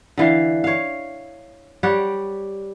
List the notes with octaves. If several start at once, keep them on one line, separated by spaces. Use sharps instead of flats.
D3 E3 F5
C#5 F5
G3 G4 C#5 F#5